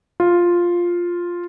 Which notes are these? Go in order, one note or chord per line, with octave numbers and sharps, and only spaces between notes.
F4